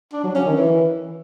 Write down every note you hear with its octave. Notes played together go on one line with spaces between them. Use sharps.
D4
F#3
C#4
D#3
E3